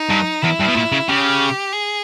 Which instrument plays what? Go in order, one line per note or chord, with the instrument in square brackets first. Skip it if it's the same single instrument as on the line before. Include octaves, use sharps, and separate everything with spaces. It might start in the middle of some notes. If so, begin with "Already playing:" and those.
Already playing: [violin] D#4
[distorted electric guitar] G2
[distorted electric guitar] E2 [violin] E4
[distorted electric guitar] G2
B2
A#2
C#3
[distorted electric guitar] C#3 [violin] G4
[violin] G#4